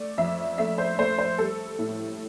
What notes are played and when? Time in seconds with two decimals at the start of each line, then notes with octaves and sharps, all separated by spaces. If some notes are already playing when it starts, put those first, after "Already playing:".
Already playing: A3 D5
0.18 F2 E5
0.58 A3 E5
0.78 C5
0.99 A3 C5
1.18 C5
1.38 G3 A4
1.79 A2